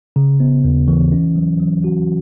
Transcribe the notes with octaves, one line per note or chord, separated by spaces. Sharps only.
C#3
B3
D#2
E3
C#4
F#3
F#3
F#4